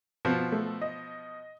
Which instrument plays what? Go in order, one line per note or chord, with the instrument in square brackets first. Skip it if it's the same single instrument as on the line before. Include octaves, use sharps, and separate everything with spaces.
[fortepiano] B2 F3
[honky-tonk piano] A3
D#5